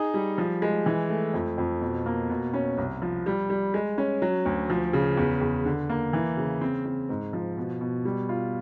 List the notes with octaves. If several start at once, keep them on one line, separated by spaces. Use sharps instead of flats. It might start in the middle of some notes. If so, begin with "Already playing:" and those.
Already playing: D#4 G#4
G3
F3
G#3
E3
A3
F2
F2
B2
A#3
B2
C#4
C2
F3
G3
G3
G#3
C#4
F#3
D2
F3
C#3
E2
E2
D3
A#3
E3
C#3
C4
C4
G#2
F3
B2
B2
G3
F4